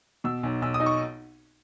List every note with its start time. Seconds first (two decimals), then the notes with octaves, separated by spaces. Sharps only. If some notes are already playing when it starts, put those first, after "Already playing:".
0.24 B2 E6
0.43 B1
0.62 B1 E6
0.74 D#6
0.80 D#4
0.86 C#6